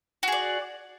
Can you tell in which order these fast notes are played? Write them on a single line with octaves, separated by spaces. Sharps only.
F#4 G#4 D5